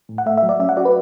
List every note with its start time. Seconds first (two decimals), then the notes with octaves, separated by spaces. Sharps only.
0.09 A2
0.18 F#5
0.26 A3 E5
0.37 E5
0.43 F#3
0.49 D5
0.60 C#4 E5
0.69 F#5
0.77 F#4 D5
0.85 B4